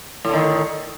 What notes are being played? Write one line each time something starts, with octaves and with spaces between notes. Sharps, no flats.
A2 D3 D#3